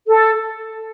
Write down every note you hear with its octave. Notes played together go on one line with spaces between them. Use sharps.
A4